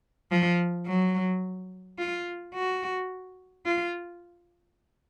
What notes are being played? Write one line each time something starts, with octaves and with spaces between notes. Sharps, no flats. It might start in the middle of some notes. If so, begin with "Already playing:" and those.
F3
F#3
F4
F#4
F4